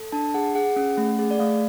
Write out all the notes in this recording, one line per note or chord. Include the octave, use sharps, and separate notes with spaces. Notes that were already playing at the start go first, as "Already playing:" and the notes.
Already playing: A4
D4 A5
G#4 F#5
G#4 F#5
C#4
A3
G#4
D5
A3 F5